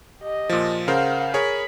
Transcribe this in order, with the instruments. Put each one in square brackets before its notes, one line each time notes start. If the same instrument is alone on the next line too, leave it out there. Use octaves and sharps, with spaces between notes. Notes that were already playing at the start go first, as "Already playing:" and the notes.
[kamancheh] G4 D#5
[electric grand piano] A#2 F3
[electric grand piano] C#3 A#4 C5 [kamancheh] F5 F#5
[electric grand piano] G#4 A#4 C#5 [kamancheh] B5